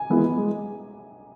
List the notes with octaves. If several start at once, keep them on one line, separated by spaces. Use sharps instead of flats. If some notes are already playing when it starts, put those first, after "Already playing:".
Already playing: G#5
E3 G#3 B3 E4
G#3